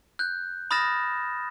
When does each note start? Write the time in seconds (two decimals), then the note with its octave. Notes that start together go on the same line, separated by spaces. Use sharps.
0.19 F#6 G6
0.71 B5 D#6 F6 A6 A#6 E7